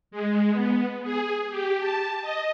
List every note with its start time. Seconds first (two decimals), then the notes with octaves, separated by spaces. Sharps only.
0.11 G#3
0.53 B3
1.03 G#4
1.50 G4
1.80 A5
2.22 D#5